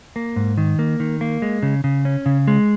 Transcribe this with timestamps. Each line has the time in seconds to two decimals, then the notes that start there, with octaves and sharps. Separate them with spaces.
0.16 A#3
0.36 G#2
0.57 D#3
0.79 A#3
1.00 D#3
1.21 A#3
1.42 G#3
1.63 C#3
1.84 C#3
2.05 C#4
2.26 C#3
2.47 G#3